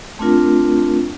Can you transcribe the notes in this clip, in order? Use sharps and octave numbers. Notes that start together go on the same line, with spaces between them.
A3 C4 D4 F4 A#4